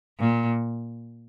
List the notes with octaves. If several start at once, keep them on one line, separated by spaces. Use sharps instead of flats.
A#2